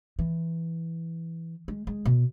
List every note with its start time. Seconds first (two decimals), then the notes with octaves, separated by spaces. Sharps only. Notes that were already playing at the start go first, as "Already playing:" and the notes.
0.19 E3
1.68 G#3
1.87 G#3
2.05 B2